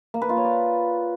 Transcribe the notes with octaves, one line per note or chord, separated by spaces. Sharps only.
A#3
B4
F4
C#5
D5